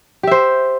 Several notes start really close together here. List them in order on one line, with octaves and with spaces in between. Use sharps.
G4 E5 C5